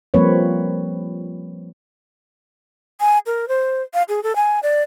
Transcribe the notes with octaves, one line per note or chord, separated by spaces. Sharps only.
F3 G3 A#3 C4 B4 C#5
G#5
A#4
C5
F5
G#4
A4
G#5
D5